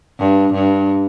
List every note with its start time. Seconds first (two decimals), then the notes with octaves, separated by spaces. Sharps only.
0.19 G2
0.54 G2